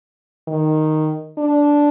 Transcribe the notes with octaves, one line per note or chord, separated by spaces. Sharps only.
D#3
D4